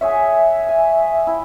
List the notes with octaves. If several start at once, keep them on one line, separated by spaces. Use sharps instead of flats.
G#4 C#5 E5 F#5
F5 G#5
E4 G5